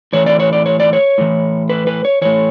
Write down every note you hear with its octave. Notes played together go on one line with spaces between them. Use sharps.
A2 E3 C#5
D5
C#5
D5
C#5
D5
C#5
A2 E3
B4
B4
C#5
A2 E3 C#5